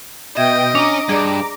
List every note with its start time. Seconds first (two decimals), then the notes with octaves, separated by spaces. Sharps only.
0.37 B2 D#5 E5 G5 G#6
0.75 C#4 D4 A#5 D6
1.09 G2 G#4 D5